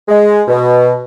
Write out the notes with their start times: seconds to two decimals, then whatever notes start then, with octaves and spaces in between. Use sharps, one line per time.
0.09 G#3
0.48 B2